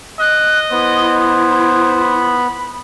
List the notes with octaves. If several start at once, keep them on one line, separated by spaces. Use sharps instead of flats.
D#5 F#6
B3 E4 C5
B5